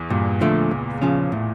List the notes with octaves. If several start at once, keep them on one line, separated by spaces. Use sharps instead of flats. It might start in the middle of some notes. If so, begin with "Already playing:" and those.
Already playing: E2 E3
G2 A#2
D3 F3 A3 D4
C#2
C#3 F3 C#4
A2